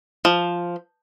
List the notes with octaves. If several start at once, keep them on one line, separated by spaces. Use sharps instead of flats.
F3